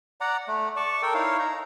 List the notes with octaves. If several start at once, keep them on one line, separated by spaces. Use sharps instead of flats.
D5 F#5 A#5
A3
D5 A5 C#6
A4 A#4 G5
D#4 E4 C#5 F5
A#5